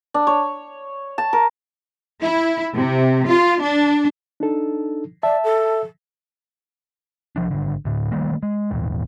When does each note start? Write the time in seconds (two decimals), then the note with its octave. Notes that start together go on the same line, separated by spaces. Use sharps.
0.14 D4
0.27 C#5
1.18 A5
1.33 A#4
2.21 E4
2.74 C3
3.26 F4
3.61 D4
4.40 D4 D#4 A4
5.23 D5 E5 A5
5.44 A4
7.36 C2 F3 D4
7.51 G#1 D3
7.85 D2 A2
8.12 D#3 G3 A3 A#3
8.43 G#3
8.71 G#1 D#2 A#2 E3